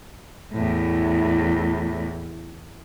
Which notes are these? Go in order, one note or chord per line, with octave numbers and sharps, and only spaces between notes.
E2 A2